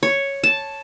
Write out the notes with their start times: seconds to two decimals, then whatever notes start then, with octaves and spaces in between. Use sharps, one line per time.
0.03 C#5
0.44 A5